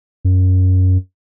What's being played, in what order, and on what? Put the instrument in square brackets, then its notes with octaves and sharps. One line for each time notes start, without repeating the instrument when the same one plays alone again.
[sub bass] F#2